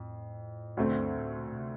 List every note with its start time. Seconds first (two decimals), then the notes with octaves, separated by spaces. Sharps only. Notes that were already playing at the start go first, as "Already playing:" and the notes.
Already playing: F2 A2
0.77 D2 A#2 D3 A3 C4
0.98 G2
1.17 A2
1.37 A#2
1.51 A#2
1.57 C3